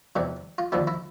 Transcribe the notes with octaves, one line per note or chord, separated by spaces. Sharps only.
E2 C3 E3
F4
D#2 D3 F3 E4
E4